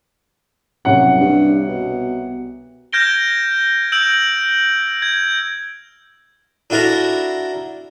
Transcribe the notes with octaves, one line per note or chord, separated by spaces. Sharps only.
F#1 C2 C#5 F#5
G2
B2
F6 G6 G#6 A#6 D7 G7
E6 G6 D7 F#7
G#6
D4 E4 F#4 A4 A#4